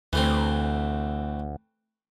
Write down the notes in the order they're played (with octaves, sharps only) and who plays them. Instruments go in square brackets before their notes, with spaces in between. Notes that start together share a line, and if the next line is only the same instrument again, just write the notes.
[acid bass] D2 [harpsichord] E3 A3 C4